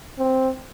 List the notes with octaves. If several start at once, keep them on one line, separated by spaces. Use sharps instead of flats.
C4